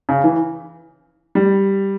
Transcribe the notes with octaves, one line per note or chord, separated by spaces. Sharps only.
C#3
E3
G3